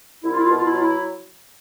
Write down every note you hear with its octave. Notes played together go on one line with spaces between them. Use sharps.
C2 E4
F4
E4
F4
B2 E4
F4
E4
F#3 F4
E4